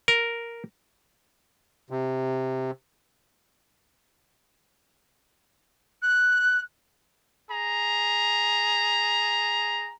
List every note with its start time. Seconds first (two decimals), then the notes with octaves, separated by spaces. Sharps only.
0.08 A#4
1.90 C3
6.03 F#6
7.50 G#4 A#5